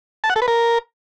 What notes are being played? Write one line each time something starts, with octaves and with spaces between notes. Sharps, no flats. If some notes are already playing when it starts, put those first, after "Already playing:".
A5
F#5
A4
B4
A#4